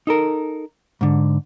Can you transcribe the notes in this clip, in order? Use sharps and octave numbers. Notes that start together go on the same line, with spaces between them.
D#4 A4 A#4
G#2 D3